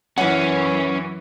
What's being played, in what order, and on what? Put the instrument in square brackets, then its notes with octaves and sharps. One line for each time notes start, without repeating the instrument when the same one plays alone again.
[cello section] F#2 E3 [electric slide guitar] C#4 [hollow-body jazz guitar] B4 F#5